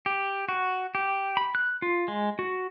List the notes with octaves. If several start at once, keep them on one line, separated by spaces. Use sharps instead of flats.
G4
F#4
G4
B5
F#6
F4
G#3
F#4